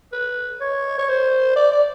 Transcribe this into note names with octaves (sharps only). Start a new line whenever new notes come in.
B4
C#5
C#5
C5
D5
D5